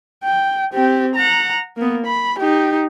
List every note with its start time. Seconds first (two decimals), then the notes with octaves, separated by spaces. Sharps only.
0.24 G5
0.74 C4 G4
1.16 F#5 A#5
1.77 A#3 B3
2.06 B5
2.39 D#4 G4